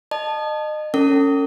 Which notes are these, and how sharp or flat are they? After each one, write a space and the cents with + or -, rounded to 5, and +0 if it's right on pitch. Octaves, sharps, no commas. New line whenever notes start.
D#5 -30 A5 +0
C#4 +0 A4 +45